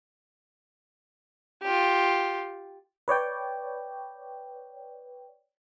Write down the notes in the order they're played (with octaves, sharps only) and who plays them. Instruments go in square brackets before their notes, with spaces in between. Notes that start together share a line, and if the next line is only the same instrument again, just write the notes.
[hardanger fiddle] F4 G4
[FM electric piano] B4 C#5 D5 G5